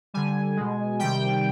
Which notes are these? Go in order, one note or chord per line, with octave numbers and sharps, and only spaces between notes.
D3 G3 G#5
B2 G#3
C3 D#3 G3 G5